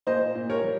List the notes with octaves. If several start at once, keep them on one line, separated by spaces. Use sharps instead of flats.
A#2 C5 D#5
A#2
A#4 C#5
G3